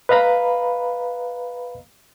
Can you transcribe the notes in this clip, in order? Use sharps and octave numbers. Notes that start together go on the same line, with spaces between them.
B4 D#5 F5 A#5 B5